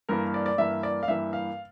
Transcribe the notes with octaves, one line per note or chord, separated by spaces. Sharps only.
G2 E3 A#3 A#4
D5
D5
G2 E3 A#3 E5
D5
F5
G2 E3 A#3 E5
F5